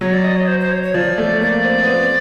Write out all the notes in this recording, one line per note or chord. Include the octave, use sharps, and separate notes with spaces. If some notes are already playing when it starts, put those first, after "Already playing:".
F#3 C#5
D5
D#5
C#5
C5
C5
C#5
C#5
F3 D5
A3
A#3 D5
C4
B3
C4